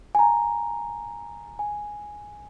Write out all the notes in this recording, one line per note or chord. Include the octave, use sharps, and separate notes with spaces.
G#5
A#5
G#5